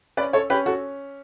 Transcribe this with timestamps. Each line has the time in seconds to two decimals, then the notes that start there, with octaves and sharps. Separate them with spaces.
0.17 C#4 B4 D5
0.33 A4 C#5
0.50 C#4 G4 B4
0.66 F#4 A4